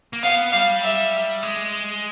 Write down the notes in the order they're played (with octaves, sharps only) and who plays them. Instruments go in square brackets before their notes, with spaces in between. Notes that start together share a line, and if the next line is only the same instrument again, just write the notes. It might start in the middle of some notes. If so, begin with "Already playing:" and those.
[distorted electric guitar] A#3
[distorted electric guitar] B3 [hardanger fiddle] F5
[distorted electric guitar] G3 [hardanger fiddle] F5
[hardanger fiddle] E5
[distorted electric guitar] G#3